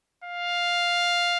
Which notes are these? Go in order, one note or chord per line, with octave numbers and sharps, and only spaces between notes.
F5